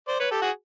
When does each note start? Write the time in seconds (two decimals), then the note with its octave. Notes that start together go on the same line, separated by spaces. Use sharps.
0.08 C5 D5
0.19 B4 C#5
0.31 G4 A4
0.42 F#4 G#4